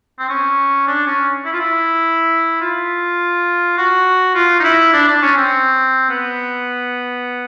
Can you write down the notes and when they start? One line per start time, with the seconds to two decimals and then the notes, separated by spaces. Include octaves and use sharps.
0.19 C4
0.29 C#4
0.87 D4
1.06 C#4
1.45 E4
1.53 F4
1.60 E4
2.61 F4
3.78 F#4
4.35 F4
4.60 D#4
4.64 E4
4.93 D4
5.08 D4
5.22 C#4
5.37 C4
6.09 B3